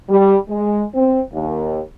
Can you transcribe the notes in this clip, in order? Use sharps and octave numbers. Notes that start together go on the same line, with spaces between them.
G3
G#3
C4
D#2